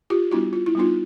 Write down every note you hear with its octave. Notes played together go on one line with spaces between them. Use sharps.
F4 G4
G3 B3 D4 E4 F#4
F4
E4
G3 B3 D4 D#4 F4